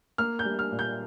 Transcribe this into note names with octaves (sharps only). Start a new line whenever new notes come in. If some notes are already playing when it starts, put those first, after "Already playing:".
A#3 F6
G6
G3
F6
A#2
G6